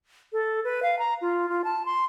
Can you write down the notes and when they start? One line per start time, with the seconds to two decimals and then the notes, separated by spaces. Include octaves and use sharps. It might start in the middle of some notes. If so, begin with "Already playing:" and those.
0.33 A4
0.64 B4
0.83 F5
0.99 A#5
1.21 F4
1.49 F4
1.64 A5
1.85 C6